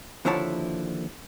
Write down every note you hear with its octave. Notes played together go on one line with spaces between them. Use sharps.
D#2 D3 F3 E4 C#5 A5